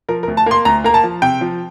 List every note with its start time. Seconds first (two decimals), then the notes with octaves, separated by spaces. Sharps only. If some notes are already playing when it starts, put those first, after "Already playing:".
0.09 F3 A#4
0.23 A#4
0.28 D2
0.37 A5
0.46 A#3 C6
0.65 D2 A#5
0.84 A#3 A#5
0.94 A5
1.04 F3
1.22 C3 G5
1.41 F3